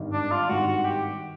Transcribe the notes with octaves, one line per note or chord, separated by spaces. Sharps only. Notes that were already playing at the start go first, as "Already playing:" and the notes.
Already playing: G#1 G2 D#3 G3
D4
F4
G#1 G2 D#3 G3 F#4
F#4
G4